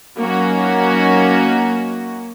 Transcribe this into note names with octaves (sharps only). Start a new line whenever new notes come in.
F#3 A#3 C#4 D#4 F#4